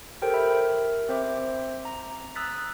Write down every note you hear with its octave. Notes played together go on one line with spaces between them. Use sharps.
G4 A4 A#4 C5 G5
A#4 E5 B5
C4 C5 E5 D6
A#5
A#5 D#6 E6 F#6 A6 B6